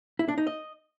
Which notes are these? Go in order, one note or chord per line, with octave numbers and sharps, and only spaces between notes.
E4
D4
D#4
D#5